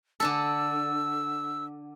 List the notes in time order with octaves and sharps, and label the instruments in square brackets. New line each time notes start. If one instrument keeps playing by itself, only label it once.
[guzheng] D3 D4 A4 [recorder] E6